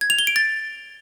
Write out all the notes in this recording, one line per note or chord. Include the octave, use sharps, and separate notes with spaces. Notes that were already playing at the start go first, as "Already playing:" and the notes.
G#6
F7
G7
D7
A6